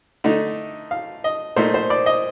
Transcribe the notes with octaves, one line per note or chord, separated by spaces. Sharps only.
D3 A3 D#4
F5
D#5
A#2 A3 D#4 C5
C5
D5
D#5